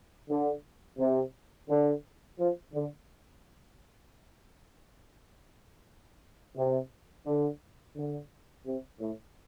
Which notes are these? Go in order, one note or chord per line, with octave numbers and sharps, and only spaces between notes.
D3
C3
D3
F3
D3
C3
D3
D3
C3
A2